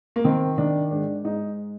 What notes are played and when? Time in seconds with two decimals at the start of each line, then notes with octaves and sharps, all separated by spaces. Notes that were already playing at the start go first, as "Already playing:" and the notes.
0.16 A#3
0.24 D#3 C4
0.58 D#3 D4
0.91 G#2 D4
1.24 G#2 D#4